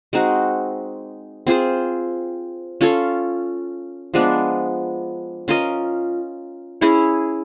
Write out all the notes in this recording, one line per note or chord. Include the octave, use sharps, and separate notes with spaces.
G#3 C4 D#4 F#4
C4 F4 G#4 C5
C#4 F4 A4 C#5
F3 G#3 B3 D4
C#4 F4 A#4 D#5
C#4 E4 G#4 C#5